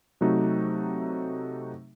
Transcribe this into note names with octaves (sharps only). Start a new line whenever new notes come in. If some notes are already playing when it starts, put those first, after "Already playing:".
C3 F#3 A3 D#4 F#4